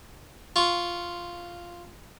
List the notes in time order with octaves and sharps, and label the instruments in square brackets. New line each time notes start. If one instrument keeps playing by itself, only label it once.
[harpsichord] F4 C#6